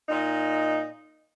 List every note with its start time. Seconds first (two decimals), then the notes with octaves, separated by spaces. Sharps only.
0.09 A#2 D#4